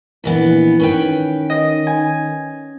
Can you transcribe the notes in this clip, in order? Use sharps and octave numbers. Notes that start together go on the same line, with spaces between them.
A#1 D#3 E3 B3
D#3 C#4 B4 G5
D#5
G#5